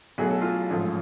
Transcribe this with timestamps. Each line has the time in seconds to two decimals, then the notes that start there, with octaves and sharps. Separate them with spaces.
0.18 B1 B2 F#3 A3 G#4
0.30 A4
0.41 F4 G#4
0.70 A1 G#2 F3 A3